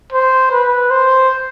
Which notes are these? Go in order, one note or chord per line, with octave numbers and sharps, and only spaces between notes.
C5
B4
C5